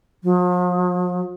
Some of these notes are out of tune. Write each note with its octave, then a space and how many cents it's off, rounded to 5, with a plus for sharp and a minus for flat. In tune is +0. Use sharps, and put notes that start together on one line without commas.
F3 +45